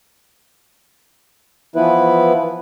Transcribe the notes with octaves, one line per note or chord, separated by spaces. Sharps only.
E3 F3 B3 E4 B4